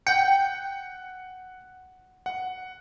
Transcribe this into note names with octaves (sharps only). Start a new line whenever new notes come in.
F#5 G5 C#7
F#5